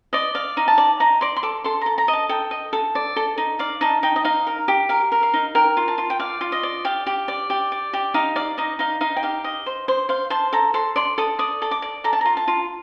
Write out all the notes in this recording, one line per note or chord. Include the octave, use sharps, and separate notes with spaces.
D5 D#5
D5 F5
D#4
A5
D5
D#4 A#5
D5 C6
C6
A4 D6
A4 C6
A4 A#5
A#5
D#5
A5
A4 G5
D#5
A4
D5
A4
D#4
D5 F5
D#4 A5
D#4 G5
D#5
D#4 F5
A#4
G4
A#4 F5
A#4
F5
D#4
A#4 G5
F4
A5
F4
G5
D5 F5
F4
D#5
D5
G4 F5
G4
D5
G4
D5
G4
D#4 F5
D5 F5
D#4 D#5
D#4 F5
D#4 F5
G5
G4 F5
D#5
C5
C5
C5 F5
C5 A5
A4 A#5
A4 C6
D5 C6
A4 D#6
D5 D#6
A4
D6
D5
A4 A#5
A5
F4 A#5
A5
F4